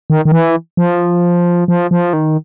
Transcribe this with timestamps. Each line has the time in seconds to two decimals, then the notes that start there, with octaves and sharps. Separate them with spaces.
0.10 D#3
0.25 D#3
0.32 E3
0.77 F3
1.68 F3
1.91 F3
2.13 D#3